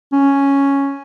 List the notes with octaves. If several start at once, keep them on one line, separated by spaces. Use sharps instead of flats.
C#4